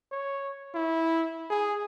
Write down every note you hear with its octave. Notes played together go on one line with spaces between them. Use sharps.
C#5
E4
G#4